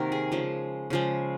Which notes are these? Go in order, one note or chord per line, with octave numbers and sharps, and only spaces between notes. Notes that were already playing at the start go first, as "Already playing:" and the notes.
Already playing: C3 D#3 A#3 F#4 A#4
G#4
C#3 F3 G#3
C#3 F3 G#3